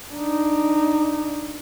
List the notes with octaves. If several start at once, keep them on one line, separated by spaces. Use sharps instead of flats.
D4 D#4